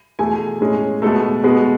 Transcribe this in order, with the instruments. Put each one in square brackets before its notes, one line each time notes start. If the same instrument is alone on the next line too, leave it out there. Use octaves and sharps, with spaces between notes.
[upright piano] E2 B2 A3 G#4 G#5
A2 G#3 C#4
B2 G#3 A3 B3 A4
B2 G#3 B3